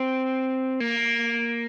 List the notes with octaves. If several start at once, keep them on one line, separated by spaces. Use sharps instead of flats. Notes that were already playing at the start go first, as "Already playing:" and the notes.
Already playing: C4
A#3